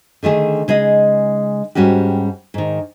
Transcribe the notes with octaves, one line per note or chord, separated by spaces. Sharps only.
D3 D#3 A3 G#4
C#3 G#3 D#4 D#5
G#2 G3 C#4 F#4 G4
G#2 D#3